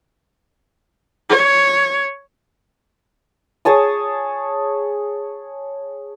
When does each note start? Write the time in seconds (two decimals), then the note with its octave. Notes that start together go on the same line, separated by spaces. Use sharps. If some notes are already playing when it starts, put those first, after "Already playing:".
1.29 C#5
3.65 G#4 C#5 A5 D#6